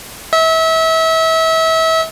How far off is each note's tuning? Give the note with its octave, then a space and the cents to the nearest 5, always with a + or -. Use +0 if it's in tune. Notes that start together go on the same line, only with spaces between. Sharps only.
E5 -30